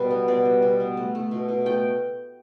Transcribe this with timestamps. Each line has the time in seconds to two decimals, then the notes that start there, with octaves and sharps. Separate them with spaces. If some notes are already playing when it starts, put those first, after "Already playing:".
Already playing: B2 G3 B4
0.11 B3
0.28 B2 D5
0.45 G3
0.62 B2
0.80 B3
0.97 A3
1.15 A3
1.31 B2
1.48 B2
1.66 A3 G5